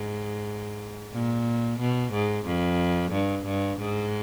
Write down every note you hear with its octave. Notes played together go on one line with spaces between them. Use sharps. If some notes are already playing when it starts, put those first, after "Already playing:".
Already playing: G#2
A#2
B2
G#2
F2
G2
G2
G#2